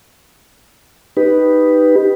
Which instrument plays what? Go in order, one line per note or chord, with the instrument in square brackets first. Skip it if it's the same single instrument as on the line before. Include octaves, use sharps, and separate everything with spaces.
[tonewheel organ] D#4 G4 B4